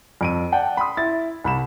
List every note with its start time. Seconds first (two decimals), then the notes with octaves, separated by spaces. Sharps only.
0.21 F2 D7 D#7
0.52 D5 F#5 G5 A5
0.77 B5 C6 D#6
0.97 E4 A6
1.44 C2 B5 E7